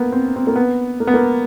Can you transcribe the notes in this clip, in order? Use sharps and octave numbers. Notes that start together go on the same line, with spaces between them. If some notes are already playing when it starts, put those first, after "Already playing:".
Already playing: A#3 B3
C4
C4
A#3
B3
A#3
B3
A#3